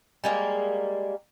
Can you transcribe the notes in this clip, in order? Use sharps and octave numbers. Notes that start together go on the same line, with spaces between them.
G3 G#3 A#3